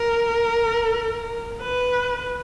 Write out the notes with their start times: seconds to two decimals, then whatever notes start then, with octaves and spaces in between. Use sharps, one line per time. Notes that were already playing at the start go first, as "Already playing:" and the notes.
Already playing: A#4
1.62 B4